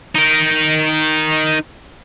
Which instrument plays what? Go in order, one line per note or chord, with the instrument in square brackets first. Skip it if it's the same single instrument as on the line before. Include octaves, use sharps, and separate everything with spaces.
[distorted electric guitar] D#4 A#4